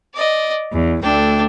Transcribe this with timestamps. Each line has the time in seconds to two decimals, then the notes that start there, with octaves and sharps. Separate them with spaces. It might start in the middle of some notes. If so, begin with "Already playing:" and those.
0.15 D5 D#5
0.73 E2
1.02 D2 A3 D4 G5